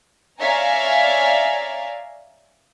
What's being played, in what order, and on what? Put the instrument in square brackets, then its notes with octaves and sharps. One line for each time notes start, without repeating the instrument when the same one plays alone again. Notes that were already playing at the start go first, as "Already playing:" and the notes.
[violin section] C#5 D5 E5 F5 G#5 A#5